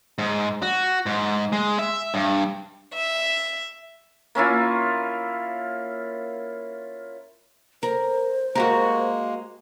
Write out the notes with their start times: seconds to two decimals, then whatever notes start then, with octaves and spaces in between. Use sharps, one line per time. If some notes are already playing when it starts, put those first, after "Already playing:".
0.18 G#2
0.62 F#4
1.06 G#2
1.52 G#3
1.79 E5
2.14 G2
2.95 E5
4.35 A#3 C#4 E4 F4
7.83 A#4 C5
8.55 G#3 A#3 F#4 G4 A#4